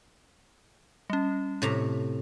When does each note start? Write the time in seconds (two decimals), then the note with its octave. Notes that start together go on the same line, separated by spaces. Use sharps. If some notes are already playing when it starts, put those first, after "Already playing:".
1.10 G3 C#4
1.62 A2 C3 A#5